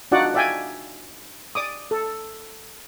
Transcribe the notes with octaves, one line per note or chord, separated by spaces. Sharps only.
D4 D#4 F4 F#4 D5 F#5
D5 E5 F5 G5 G#5
D5 D6 D#6
A4